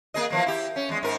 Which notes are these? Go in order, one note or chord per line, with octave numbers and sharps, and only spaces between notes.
A#3 G#4 D#5
E3 F3 A#3
E4 G4
C#4
E2 G#3
G#2 A#4